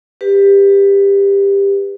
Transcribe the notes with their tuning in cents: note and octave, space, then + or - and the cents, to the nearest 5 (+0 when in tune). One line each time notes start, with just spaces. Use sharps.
G4 +20 B4 +5